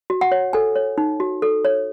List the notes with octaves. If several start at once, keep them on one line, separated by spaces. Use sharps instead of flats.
F#4
F#5
C#5
A4 G#5
C#5
D#4
F#4
A4
C#5